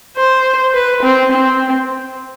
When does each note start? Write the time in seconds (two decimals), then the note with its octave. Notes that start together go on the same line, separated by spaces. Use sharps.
0.17 C5
0.74 B4
1.03 C4
1.32 C4